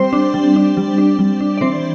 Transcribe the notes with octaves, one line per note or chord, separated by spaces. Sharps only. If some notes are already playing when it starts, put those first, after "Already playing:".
Already playing: G3 C4 C5
D4
G3
D4
G3
D4
G3
D4
D5
E3 C4 C5